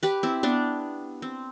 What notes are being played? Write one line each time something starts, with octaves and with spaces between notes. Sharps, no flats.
G4 B4
C4 E4
B3 D4
C4